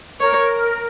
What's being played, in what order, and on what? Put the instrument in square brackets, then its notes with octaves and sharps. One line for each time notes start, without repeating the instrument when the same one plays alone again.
[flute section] A#4 [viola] C#5